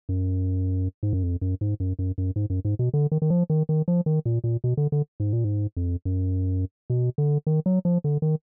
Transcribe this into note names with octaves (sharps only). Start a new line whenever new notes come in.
F#2
G#2
F#2
F2
F#2
G#2
F#2
F#2
F#2
G#2
F#2
G#2
B2
D3
D#3
D#3
F3
D#3
D#3
F3
D#3
A#2
A#2
B2
D3
D3
G#2
A#2
G#2
F2
F#2
B2
D3
D#3
F#3
F3
D3
D#3